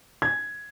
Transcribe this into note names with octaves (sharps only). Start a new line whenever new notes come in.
G#6